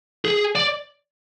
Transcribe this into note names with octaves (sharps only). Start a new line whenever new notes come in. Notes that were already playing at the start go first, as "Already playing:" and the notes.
G#4
D5